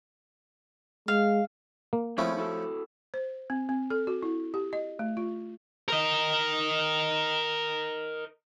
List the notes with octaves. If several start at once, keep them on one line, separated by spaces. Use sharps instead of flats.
G#3 F5
A#3
F3 A3 C4 C#4 E4 G#4
E4 F#4 A4
C5
C4
C4
A4
F#4
E4
G4
D#5
A3
F4
A#4 D#5